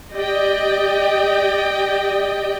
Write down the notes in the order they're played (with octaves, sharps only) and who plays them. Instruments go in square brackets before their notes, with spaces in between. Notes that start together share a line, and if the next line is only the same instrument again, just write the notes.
[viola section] G4 D5 D#5 G5